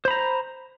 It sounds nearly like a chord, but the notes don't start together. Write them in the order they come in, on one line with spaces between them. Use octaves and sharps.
C5 B5 A#5